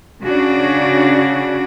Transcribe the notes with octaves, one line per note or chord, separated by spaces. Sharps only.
C#3 D4 F#4